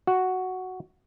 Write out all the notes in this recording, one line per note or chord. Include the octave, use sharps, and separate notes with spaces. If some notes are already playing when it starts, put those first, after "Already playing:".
F#4